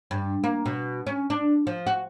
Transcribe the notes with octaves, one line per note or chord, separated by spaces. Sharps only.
G2
A#3
B2
C#4
D4
F3
F#4